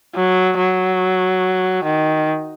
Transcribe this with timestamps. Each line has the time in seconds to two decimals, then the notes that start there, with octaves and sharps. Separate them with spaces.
0.15 F#3
0.58 F#3
1.84 D#3